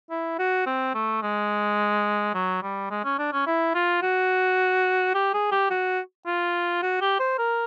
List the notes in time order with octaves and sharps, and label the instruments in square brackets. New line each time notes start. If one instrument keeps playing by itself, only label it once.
[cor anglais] E4
F#4
C4
A3
G#3
F#3
G3
G#3
C#4
D4
C#4
E4
F4
F#4
G4
G#4
G4
F#4
F4
F#4
G4
C5
A#4